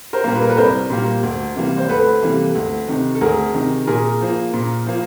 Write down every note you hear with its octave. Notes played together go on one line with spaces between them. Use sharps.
A#4 C5
A#2 G3 A#3
B4
A#4
A4 B4
C2 A#4 C5
A#2 G3 A#3
D2
C3 E3 G3 A#3
C5
D2 A4 B4
C3 E3 G3 A#3
D2
C3 D#3
A4
D2 G#4 A#4
C3 D#3
A#2 G#4 A#4
F3 A#3
A#2
F3 A#3